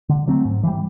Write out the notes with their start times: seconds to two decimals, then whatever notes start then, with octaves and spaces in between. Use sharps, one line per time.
0.09 D3
0.28 F#3 A3 C4
0.45 G#2
0.63 E3 G3